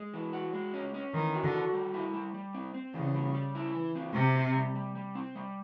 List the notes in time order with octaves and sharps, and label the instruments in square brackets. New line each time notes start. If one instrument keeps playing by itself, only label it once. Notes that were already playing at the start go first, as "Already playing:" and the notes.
Already playing: [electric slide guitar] G#3
E3
F#4
G#3
C#4
C#4
[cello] D#3 [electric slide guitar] E3
[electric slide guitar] F#4
[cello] D3
[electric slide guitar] F#4
G3
E4
G3
G3
C4
C4
[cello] C#3 [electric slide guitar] E3
[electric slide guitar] G3
G3
E4
E3
C4
[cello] C3 [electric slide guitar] G4
[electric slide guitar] C4
G3
G3
G3
C4
G3